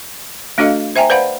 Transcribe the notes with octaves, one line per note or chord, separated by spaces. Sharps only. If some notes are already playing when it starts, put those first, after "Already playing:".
A3 D4 F#4 A4 D#5 F5
C5 E5 G5 G#5 A#5
B4 C5 D5 F5 F#5 B5